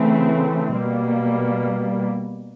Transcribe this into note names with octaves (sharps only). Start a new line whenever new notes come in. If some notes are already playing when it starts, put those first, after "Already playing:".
Already playing: C#3 E3 A3 C4
B2 G3 A#3